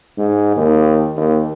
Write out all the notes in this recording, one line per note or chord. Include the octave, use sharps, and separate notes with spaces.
G#2
D#2
D#2